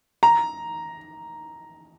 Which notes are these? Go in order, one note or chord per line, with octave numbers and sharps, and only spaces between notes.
A#5